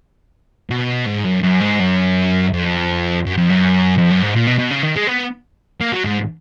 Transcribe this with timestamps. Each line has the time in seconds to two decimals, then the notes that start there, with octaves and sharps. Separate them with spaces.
0.70 B2
1.06 G#2
1.24 F#2
1.43 F#2
1.61 G#2
1.80 F#2
2.53 F2
3.26 F#2
3.38 F2
3.50 F#2
3.98 F2
4.11 F#2
4.22 G#2
4.35 A#2
4.47 B2
4.59 B2
4.71 C#3
4.83 D#3
4.96 G#3
5.07 B3
5.81 A#3
5.92 F#3
6.05 G#2